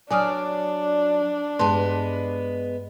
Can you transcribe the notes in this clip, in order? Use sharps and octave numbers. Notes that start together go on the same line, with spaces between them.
F#3 D4 D5 G#5 D#6 F6
G2 G#3 B3 A5 C6